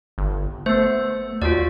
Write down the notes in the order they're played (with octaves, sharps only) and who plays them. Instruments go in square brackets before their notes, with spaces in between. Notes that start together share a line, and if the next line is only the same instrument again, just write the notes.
[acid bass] G1
[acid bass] A3 [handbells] B3 C5
[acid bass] D#2 [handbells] F4 F#4 D5